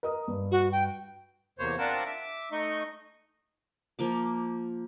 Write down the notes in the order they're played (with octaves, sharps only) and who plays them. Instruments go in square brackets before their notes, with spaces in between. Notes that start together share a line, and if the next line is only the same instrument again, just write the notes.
[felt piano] A#4 D#5 D#6
G2
[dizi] F#4
G5
[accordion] E2 C3 A#3 C5 C#5
C4 D4 F4 A#4 F#5 A5
E5 D6
A3 D#4 D#5 C#6
[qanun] F3 A#3 D6